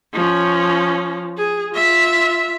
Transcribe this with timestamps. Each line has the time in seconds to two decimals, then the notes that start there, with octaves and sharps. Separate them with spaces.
0.13 F3 C#4
1.37 G#4
1.73 F4 E5